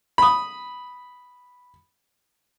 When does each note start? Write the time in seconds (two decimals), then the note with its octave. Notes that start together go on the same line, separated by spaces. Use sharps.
0.18 B5 D#6